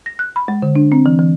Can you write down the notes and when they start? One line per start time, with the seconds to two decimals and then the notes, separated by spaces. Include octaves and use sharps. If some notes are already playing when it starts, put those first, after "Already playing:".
0.06 A#6
0.19 F#6
0.36 B5
0.48 G#3
0.62 D3
0.76 D4
0.92 C4
1.06 E3
1.19 E3